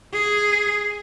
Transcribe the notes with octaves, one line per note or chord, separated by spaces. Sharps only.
G#4